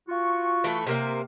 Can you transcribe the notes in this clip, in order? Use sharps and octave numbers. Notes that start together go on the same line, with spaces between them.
F4 F#4 C#6
E3 A3 A4
C3 A#3 E5